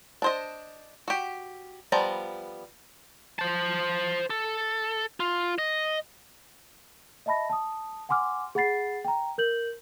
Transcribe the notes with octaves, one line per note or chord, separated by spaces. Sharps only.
D4 C5 D#5
F#4 G4
F3 G3 B3 D5 A#5
C5 A5
A4
F4
D#5
D#5 E5 A5 B5 A#6
A5 D#6
F#5 G#5 C6 D6 F6
G#4 F#5 B5 A6 C7
G5 A#5
A#4 G6 F#7